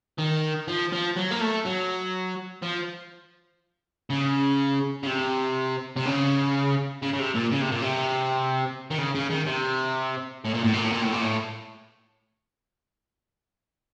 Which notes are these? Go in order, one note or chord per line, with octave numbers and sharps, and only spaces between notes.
D#3
F3
F3
F#3
A#3
A3
F#3
F3
C#3
C#3
C3
C3
C#3
C#3
C#3
C3
A#2
C#3
C3
A#2
C3
D#3
C#3
C#3
D#3
C3
A2
A#2
A2
A#2
A2
A#2
A2
A#2
A2